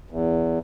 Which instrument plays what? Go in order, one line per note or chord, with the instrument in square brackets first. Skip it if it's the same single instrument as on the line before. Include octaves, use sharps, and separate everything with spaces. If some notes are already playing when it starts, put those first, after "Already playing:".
[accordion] E2